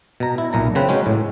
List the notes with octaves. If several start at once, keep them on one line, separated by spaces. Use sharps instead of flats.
B2 A#5
E4
B1 A#2 A#5
C#3 C4 B4
F#3 G#3 C#4 G5
A2